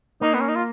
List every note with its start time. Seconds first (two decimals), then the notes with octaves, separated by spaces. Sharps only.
0.21 A#3 D#4
0.34 B3
0.40 C#4
0.49 D#4
0.56 F4